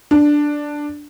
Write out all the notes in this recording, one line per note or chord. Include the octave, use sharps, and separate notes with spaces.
D4